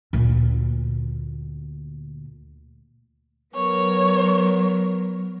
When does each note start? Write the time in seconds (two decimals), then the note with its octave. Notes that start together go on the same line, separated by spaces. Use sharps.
0.13 D2 A#2
3.55 F#3 B3 A#4 C#5